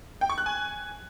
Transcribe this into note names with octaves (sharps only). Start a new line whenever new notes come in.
G5
C#6
F#6
G#5